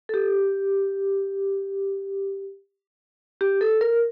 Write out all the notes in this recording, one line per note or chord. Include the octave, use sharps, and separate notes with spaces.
A4
G4
G4
A4
A#4